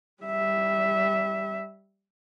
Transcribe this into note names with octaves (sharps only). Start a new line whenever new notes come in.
G3 E5